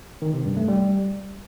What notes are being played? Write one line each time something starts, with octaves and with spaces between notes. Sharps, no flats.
D#3
C3
G2
A3
G3